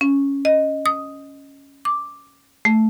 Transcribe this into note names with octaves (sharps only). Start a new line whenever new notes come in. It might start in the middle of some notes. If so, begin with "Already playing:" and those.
C#4
D#5
D#6
D6
A3